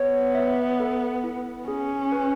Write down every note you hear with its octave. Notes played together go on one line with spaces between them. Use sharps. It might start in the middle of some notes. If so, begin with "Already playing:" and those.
Already playing: B3 C#5
E5
A4
E4
C#4 G#4
B4